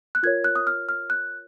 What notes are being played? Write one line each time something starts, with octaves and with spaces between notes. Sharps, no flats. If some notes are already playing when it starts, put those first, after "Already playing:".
F#6
F4 A#4 C#5 G#6
F#6
D#6
F6
F6
F#6